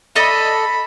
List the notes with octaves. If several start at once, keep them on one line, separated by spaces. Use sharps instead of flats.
A4 D5 D#5 B5